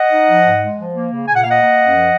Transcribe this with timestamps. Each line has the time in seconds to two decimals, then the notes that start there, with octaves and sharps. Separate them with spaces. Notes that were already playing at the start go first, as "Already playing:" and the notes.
Already playing: D#5 F#5
0.10 D#4
0.28 F3
0.44 G#2
0.61 G#3
0.78 F3
0.95 A#3
1.11 C#3
1.28 A#2 G#5
1.35 F#5
1.43 A#3 F5
1.50 D#5 F#5
1.62 A#3
1.78 F#2
1.95 F3